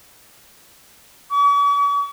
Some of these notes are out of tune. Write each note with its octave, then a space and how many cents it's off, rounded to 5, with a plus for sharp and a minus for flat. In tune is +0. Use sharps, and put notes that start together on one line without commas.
C#6 +45